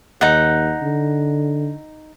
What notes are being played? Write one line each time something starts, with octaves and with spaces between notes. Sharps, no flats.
D#2 D#4 F#5
D3